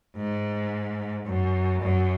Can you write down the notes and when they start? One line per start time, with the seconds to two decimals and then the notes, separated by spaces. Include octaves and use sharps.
0.17 G#2
1.26 F#2
1.81 F#2